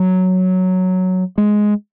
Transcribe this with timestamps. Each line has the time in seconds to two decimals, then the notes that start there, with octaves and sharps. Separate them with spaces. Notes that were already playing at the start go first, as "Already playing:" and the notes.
Already playing: F#3
1.38 G#3